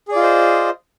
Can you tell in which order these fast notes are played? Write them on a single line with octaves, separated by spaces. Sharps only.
G#4 D5 F4 D#5 C5